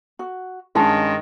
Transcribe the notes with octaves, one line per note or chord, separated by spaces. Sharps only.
F#4
G2 D#3 G#3 C#4 A5